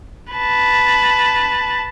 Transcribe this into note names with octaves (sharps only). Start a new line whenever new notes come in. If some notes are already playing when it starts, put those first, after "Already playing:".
B4 A5